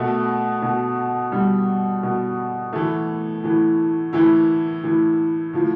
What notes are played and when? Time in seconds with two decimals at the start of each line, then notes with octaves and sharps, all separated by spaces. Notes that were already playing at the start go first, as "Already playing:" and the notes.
Already playing: B2 A3
0.62 B2
1.32 B2 G3
2.03 B2
2.72 A2 E3 A3
3.43 A2 E3
4.13 A2 E3 E4
4.83 A2 E3
5.53 A2 F3